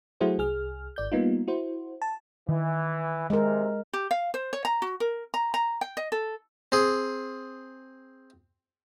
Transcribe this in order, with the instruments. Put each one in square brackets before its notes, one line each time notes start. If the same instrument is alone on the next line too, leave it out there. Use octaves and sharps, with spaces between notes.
[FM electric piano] F#3 A3 E4 F#4 G#4 C5
C2 G#4 F6
G#1 D5 G6
G3 A#3 B3 D#4 F4
E4 F#4 C5
A5
[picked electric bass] D#3 [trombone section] E3
[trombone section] C3 [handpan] G#3 A#4
[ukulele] G4
F5
C5
C#5
A#5
F#4
A#4
A#5
A#5
G5
D#5
A4
[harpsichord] C4 G#4